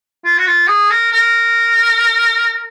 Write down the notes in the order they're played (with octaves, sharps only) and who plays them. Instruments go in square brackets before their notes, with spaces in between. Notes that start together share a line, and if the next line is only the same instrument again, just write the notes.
[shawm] F4
F#4
F4
G#4
A#4
A#4